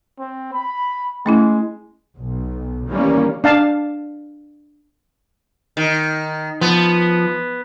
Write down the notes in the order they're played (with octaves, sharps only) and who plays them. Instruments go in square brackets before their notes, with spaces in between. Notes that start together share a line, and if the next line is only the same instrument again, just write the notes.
[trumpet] C4
B5
[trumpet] G#3 [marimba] A3 C#4 E4
[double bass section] B1
D#3 E3 G3 A#3 C#4
[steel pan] D4 F5 A5
[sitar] D#3
[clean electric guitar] F3 [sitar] B3